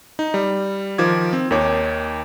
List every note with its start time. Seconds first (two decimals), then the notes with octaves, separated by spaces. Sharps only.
0.19 D#4
0.34 G3
0.98 D#3 F3 D6 G#6
1.33 C4
1.51 D#2 D#3 C#5 D6